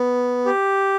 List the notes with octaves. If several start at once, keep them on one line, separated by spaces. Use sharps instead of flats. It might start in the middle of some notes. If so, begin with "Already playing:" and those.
Already playing: B3
G4